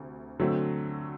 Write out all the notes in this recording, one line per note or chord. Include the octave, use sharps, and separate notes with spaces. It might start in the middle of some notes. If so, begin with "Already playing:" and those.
Already playing: D2 C3
D3 F#3 A3 C4